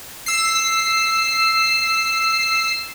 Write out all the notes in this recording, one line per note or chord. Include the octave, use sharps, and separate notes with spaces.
E6 C7